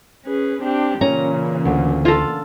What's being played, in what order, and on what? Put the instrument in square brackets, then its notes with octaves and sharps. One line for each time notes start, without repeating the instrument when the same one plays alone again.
[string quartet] C#4 G#4 B4
C4 D4 G4
[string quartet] A#2 C#3 E3 [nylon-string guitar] C#4 [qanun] A#5
[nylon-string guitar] D2
[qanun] F4 A4